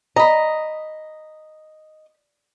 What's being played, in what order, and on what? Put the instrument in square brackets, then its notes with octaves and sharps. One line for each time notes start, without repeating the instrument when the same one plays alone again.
[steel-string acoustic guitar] D#5 [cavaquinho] A#5 B5